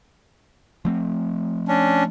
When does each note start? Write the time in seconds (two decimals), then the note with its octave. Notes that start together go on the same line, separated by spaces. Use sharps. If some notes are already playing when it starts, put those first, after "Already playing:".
0.85 F3 A3 C4
1.68 C#4 D4